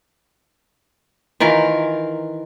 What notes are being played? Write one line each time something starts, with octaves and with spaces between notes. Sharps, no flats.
D#3 E3 F4 A#4